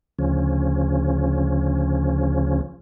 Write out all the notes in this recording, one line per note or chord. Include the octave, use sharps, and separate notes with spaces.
D2 C#3 F3 C#4